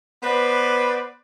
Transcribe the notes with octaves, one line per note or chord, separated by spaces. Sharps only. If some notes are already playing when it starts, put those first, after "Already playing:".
B3 B4 C5 D5